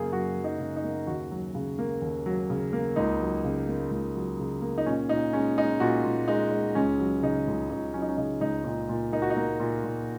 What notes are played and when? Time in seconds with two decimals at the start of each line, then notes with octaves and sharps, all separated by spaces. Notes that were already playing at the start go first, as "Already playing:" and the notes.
Already playing: F#2 C#3 F#3 A#3 G#4
0.12 F#2 F#4
0.36 F#3
0.44 D#4
0.60 C#3
0.76 D#4
0.84 A#3
1.07 D#2 F#4
1.31 F#3
1.55 C#3
1.79 A#3
2.02 D#2
2.26 F#3
2.50 C#3
2.73 A#3
2.96 C#2 D#4
3.20 F#3
3.44 C#3
3.68 A#3
3.91 C#2
4.16 F#3
4.39 C#3
4.62 A#3
4.78 D#4
4.86 A#2 C#4
5.09 A#2 D#4
5.33 G#3 C#4
5.58 G#3 D#4
5.80 A#2 F#4
6.04 A#2
6.28 G#3 D#4
6.51 G#3
6.75 C#2 C#4
6.99 F#3
7.22 C#3 D#4
7.47 C#2
7.71 C#2 D#4
7.94 F#3 C#4
8.02 D#4
8.09 C#4
8.17 C#3 D#4
8.41 C#2 D#4
8.64 A#2 D#4
8.89 A#2
9.13 A#3 D#4
9.22 F#4
9.30 D#4
9.37 A#3
9.60 A#2
9.84 A#2